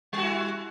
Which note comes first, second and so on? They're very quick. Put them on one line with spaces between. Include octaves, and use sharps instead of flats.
G3 F#4 E4